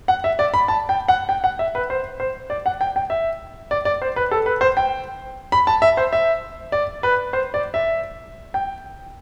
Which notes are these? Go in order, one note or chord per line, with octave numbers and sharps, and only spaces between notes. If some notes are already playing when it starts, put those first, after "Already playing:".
F#5
E5
D5
B5
A5
G5
F#5
G5
F#5
E5
B4
C5
C5
D5
F#5
G5
G5
E5
D5
D5
C5
B4
A4
B4
C5
G5
B5
A5
E5
C5
E5
D5
B4
C5
D5
E5
G5